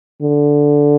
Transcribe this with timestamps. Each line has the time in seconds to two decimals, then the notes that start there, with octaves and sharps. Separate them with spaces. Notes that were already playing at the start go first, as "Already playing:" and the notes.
0.22 D3